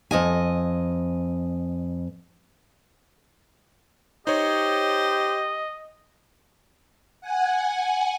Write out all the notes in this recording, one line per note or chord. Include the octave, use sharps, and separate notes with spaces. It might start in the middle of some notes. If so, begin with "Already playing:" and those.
F2 D#5 G#5
D#4 G4 C5 C#5 D#5
F#5 G#5